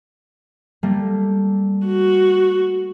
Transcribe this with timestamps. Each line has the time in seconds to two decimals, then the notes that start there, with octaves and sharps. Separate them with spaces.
0.83 G3 A3 A#3
1.86 F#4